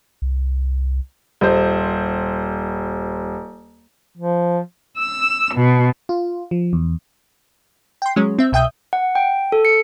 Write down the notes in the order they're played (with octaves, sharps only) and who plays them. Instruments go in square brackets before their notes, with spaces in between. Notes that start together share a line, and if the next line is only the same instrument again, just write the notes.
[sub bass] C2
[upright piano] D#1 C5
[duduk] F3
[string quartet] E6
B2
[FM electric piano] F4
F3
E2
[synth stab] G5 C6
F#3 G#3 C#4
C4 E5
C2 B2 E5 G5 D#6 G6
[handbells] F#5
G5
A4
C#7